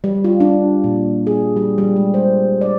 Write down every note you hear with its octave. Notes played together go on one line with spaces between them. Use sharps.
G3
F4
D4
A#2
G#4
G3
G3
G#3
C5
D5